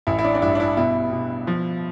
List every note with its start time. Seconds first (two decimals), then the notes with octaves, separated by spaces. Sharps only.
0.07 A1 E4
0.19 E4
0.25 D4
0.35 D4
0.42 G2 E4
0.55 D4
0.60 E4
0.77 B2 E4
1.12 B2
1.47 F3